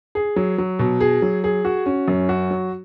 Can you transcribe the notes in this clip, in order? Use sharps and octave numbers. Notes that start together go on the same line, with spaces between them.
G#4
F#3
F#3
B2
G#4
F#3
G#4
F#4
C#4
F#2
F#4
F#3